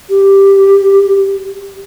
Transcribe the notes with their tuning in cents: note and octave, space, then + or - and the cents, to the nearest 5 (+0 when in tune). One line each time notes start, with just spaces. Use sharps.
G4 +5